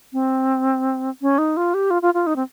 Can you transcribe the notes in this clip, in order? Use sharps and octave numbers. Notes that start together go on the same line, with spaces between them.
C4
C#4
D#4
F4
G4
F4
F4
F4
D#4
C4